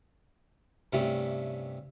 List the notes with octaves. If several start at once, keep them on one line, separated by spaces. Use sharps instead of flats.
G2 C3 G3 A3 C#4 E4